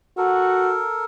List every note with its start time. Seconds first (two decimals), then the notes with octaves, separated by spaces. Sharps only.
0.18 F#4 A4 A#4